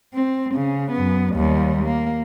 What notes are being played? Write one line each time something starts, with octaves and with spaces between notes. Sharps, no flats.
C4
C#3
F#2 B3
D#2 G3
A#3